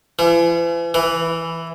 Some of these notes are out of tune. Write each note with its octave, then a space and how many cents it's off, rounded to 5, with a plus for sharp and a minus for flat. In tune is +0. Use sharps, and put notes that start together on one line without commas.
E3 +45
E3 +5